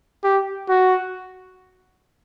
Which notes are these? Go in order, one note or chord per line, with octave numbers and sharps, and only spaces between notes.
G4
F#4